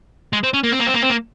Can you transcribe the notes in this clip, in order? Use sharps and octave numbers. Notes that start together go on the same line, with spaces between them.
G#3
C4
C#4
A#3
C4
A#3
C4
A#3
C4
A#3